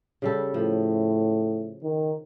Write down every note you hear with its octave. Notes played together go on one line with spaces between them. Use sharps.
C#3 G3 A4
A2 F3
D#3